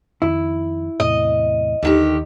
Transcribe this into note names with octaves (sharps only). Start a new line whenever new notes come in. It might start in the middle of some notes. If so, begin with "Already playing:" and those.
F2 D#3 E4
E2 A2 C3 D#5
D#2 D3 D#3 G4